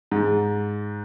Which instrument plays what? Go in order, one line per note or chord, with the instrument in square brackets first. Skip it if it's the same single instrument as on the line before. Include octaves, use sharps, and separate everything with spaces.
[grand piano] G#2